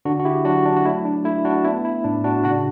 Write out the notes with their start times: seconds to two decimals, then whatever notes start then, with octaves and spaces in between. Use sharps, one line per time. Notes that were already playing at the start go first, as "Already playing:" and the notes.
0.05 D3 D4 F#4
0.20 F#4
0.25 E4 G4
0.45 F#3 D4 F#4
0.66 D4
0.76 F#4
0.85 A3 E4
1.05 D4
1.25 A3 E4
1.45 D4 F#4
1.64 B3 E4
1.85 E4
2.04 A2 D4
2.24 D4 F#4
2.44 C#3 D4 F#4